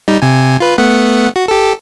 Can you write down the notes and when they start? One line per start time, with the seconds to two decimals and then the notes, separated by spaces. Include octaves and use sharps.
0.08 G3 D#4
0.22 C3 G#5
0.60 F4 B4
0.78 A3 B3 F#5
1.36 F#4
1.48 G4 A4